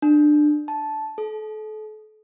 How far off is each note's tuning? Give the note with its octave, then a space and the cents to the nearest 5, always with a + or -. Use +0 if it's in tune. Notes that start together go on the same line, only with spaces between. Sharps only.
D4 +20
A5 -10
A4 -35